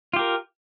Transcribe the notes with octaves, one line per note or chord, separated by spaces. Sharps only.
F4 G4 A#4